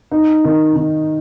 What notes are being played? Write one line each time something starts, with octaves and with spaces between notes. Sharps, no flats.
D#4
D#3
D#3